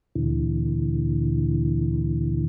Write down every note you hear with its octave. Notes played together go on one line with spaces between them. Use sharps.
D2 A#2 D3 E3